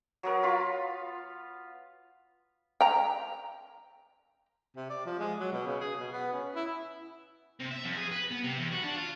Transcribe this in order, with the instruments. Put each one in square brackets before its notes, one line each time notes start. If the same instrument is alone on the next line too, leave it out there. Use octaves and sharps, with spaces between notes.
[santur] F#3 B3 A#4
F4 F5 B5
[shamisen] G5 A#5
[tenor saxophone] C3
D5
F3
G#3
F#3
B2
C#3
G#4
B2
B3
C#4
E4
[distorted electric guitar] C3
E5
F2
G#4
B4
B3
C3
E2
F#4
D4
F4